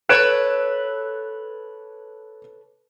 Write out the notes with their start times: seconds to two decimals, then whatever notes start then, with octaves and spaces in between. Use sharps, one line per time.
0.09 A4 B4 C#5 F#6 D7 E7